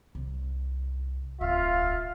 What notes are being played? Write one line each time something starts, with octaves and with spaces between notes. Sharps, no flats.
C2
D1 B1 F4 E5 F5